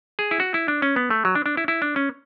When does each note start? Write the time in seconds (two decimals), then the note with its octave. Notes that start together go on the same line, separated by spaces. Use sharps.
0.19 G#4
0.31 E4
0.40 F#4
0.54 E4
0.68 D4
0.82 C#4
0.96 B3
1.10 A3
1.25 F#3
1.35 D4
1.46 D4
1.57 E4
1.68 E4
1.82 D4
1.96 C#4